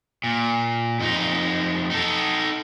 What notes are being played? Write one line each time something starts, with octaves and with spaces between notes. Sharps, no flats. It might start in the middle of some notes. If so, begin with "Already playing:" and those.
A#2
F2 D#4
D#4 A4